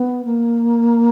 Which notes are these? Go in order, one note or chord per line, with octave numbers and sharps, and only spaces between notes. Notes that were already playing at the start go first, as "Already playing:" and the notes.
Already playing: B3
A#3